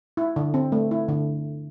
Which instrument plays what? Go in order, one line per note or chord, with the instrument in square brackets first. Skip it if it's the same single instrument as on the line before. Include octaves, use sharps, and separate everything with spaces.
[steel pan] E4
D3
C4
A3
E4
D3